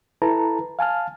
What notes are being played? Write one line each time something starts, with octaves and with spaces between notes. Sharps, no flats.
E4 A4 B4 A5 A#5
F5 G#5 A5 F6